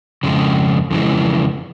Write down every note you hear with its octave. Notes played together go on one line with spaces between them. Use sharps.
F2 C#3 G#3
F2 C#3 E3 G#3